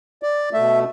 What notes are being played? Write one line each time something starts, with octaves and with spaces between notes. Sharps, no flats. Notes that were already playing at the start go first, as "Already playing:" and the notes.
D5
B2 A3 E5